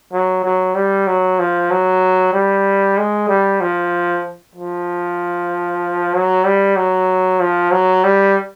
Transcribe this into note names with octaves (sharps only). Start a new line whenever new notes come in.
F#3
F#3
G3
F#3
F3
F#3
G3
G#3
G3
F3
F3
F#3
G3
F#3
F3
F#3
G3